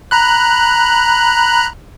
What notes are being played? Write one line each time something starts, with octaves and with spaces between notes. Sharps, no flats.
A#5 B5 F#6